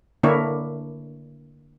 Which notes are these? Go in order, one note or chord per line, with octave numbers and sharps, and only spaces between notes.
D3 A#3 D4 E4 A#4 C#5